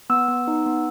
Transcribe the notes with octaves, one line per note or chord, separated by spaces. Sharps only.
B3 E6
B3
D#4
B3